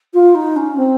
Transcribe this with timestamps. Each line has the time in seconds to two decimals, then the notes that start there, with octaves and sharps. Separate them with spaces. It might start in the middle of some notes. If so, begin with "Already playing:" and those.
0.14 F4
0.35 D#4
0.56 C#4
0.77 C4